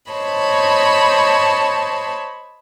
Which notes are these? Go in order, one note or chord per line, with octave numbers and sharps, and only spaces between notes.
C5 C#5 D#5 A5 B5